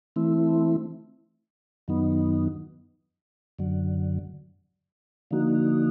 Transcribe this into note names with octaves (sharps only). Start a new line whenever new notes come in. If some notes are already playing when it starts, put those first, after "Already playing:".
E3 A3 C4 E4
F#2 D#3 F#3 B3 D#4
F#2 D3 F#3
D3 F3 A#3 D#4 F#4